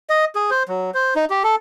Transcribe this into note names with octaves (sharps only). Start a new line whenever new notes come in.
D#5
G#4
C5
F#3
C5
D#4
G4
A4